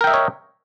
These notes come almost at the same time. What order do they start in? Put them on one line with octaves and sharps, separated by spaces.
A#4 G5 E5 D#5 C#5